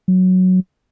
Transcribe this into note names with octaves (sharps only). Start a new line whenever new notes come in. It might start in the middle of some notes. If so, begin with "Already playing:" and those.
F#3